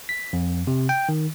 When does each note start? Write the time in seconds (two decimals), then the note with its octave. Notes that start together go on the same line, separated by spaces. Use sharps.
0.09 B6
0.33 F2
0.67 C3
0.89 G5
1.09 D#3